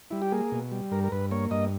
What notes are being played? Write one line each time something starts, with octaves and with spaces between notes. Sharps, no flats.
G3 E4
G4
A#3 G#4
B2
G3
G2 A#4
A#4
G2 B4
A#3 C#5
G2 D#5